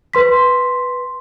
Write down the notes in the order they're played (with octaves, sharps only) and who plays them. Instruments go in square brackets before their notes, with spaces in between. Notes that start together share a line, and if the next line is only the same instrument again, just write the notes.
[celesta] B4 C6 B6